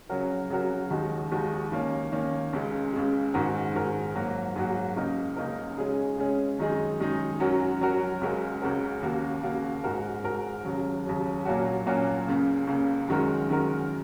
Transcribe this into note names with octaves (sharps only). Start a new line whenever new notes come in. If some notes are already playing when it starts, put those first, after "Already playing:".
C#3 F#3 C#4 F#4 A#4
C#3 F#3 C#4 F#4 A#4
D#2 D#3 G#3 D#4 F#4
D#2 D#3 G#3 D#4 F#4
D#3 A#3 C#4
D#3 A#3 C#4
C#2 C#3 G#3
C#2 C#3 G#3
G#2 D#3 G#3 F#4 A#4
G#2 D#3 G#3 F#4 A#4
G#2 F#3 A#3 F#4
G#2 F#3 A#3 F#4
C#2 C#3 A#3 D#4 A#4
C#2 C#3 A#3 D#4 A#4
C#3 G#3 C#4 G#4
C#3 G#3 C#4 G#4
F#2 D#3 G#3 D#4 G#4
F#2 D#3 G#3 D#4 G#4
F#2 F#3 C#4 F#4 A#4
F#2 F#3 C#4 F#4 A#4
C#2 C#3 G#3 F#4 A#4
C#2 C#3 G#3 F#4 A#4
D#2 C#3 A#3 F#4
D#2 C#3 A#3 F#4
G#2 G#3 F#4 A#4
G#2 G#3 F#4 A#4
D#2 C#3 F#3
D#2 C#3 F#3
A#2 F#3 A#3 C#4 F#4
A#2 F#3 A#3 C#4 F#4
C#2 C#3 A#3
C#2 C#3 A#3
F#2 D#3 G#3 F#4 A#4
F#2 D#3 G#3 F#4 A#4